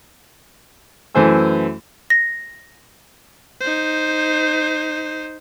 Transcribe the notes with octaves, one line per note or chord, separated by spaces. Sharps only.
F#2 E3 A3 C5 G#5 E6
A#6
D#4 C5